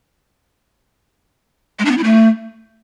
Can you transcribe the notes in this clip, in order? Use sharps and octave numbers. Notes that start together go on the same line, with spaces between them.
G#3
D4
B3
E4
A3